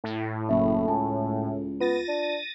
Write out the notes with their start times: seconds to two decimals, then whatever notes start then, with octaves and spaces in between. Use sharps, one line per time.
0.04 A2
0.49 F#1 E5
0.88 C#2 G#5 A5
1.80 B3 F4 A6 A#6 D#7
2.08 D4